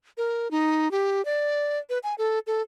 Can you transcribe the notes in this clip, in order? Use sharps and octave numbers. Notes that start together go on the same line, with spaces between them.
A#4
D#4
G4
D5
B4
G#5
A4
A4